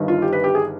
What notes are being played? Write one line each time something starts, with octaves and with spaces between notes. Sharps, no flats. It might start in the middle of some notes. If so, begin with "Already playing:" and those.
Already playing: G1 G2 D#3
F4
G4
B4
G4
G#4